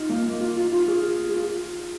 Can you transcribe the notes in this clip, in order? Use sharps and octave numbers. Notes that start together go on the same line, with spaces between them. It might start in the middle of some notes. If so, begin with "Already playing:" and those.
Already playing: D#4 F4
A#3
A#3
F4
F4
F4
G#4
G#4
F4